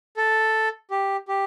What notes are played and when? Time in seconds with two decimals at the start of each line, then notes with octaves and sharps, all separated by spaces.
0.17 A4
0.91 G4
1.28 G4